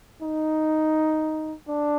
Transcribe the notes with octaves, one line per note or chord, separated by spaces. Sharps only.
D#4
D4